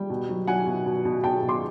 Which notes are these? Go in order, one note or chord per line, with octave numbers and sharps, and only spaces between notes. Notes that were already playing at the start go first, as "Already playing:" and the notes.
Already playing: G3 G5
B2
F#3
F#3 F#5 G#5
B2
B2
B2
B2 G5 A5
B2
C6 D6